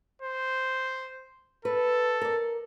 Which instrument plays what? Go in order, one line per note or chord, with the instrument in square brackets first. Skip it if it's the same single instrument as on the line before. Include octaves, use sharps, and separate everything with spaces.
[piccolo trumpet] C5
[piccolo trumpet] A4 [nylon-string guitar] B4
[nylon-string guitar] A#4 D5